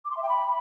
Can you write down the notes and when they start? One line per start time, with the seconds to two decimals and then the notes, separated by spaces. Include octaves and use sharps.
0.05 D6
0.11 C6
0.17 E5
0.23 G5
0.28 B5